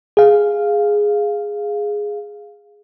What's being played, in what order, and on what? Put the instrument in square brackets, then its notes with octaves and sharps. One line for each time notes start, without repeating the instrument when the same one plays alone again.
[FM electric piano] G#4 F5